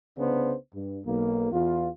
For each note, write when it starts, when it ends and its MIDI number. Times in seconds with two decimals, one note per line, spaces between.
0.18 0.54 36
0.18 0.54 49
0.18 0.54 59
0.18 0.54 62
0.18 0.54 72
0.73 0.99 43
1.05 1.49 35
1.05 1.49 58
1.52 1.89 40
1.52 1.89 65